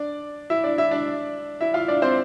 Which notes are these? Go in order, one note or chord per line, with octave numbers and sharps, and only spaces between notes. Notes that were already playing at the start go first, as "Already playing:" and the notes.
Already playing: D4 D5
E4 E5
D4 D5
E4 E5
D4 D5
E4 E5
F4 F5
D4 D5
C4 C5